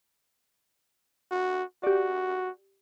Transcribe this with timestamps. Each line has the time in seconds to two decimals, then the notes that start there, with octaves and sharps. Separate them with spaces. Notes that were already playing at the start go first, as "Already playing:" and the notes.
1.31 F#4
1.83 F#4 G4 D5